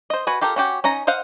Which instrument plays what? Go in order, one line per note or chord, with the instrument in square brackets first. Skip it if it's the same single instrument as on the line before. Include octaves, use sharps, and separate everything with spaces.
[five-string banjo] C5 D#5
F#4 B4 G#5
F4 G4 A4 A#4
C#4 F#4 G4
C#4 D#4 A#5
C5 D#5 F5 F#5